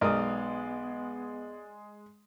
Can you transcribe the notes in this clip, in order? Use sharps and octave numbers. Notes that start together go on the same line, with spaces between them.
B1 G#3 B3 A#4 D5 D#6 F6